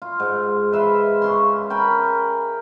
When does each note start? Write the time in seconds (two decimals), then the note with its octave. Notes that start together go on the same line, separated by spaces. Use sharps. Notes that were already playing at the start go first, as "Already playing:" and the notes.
0.02 F4
0.20 G#2 G#3
0.72 B4 E5 F5 C6
1.22 C#3 C#4 C6
1.70 A#4 G5 G#5 B5